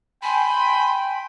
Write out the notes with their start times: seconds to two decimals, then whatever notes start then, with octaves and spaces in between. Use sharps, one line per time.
0.23 G5 G#5 B5 C6